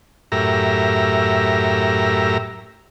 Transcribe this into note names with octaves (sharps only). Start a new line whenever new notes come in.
F#2 A2 G4 A#4 E5 A#5